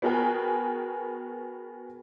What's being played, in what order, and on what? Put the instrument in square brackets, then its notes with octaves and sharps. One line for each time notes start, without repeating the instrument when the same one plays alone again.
[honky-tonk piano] B3 F#4 G#4 A#4 G5 G#5